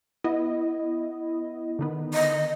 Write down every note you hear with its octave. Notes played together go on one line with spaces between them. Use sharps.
B3 E4 D#5
D3 D#3 B3
D#5